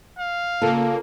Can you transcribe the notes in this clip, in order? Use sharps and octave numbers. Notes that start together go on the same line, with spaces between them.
F5
C#3 A#3 F4 A4